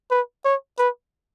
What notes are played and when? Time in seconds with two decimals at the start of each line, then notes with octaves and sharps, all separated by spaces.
0.11 B4
0.45 C#5
0.78 B4